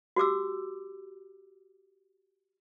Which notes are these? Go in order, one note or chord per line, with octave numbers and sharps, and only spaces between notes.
F#4 G4 D6 E6